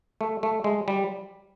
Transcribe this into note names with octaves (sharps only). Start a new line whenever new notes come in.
A3
A3
G#3
G3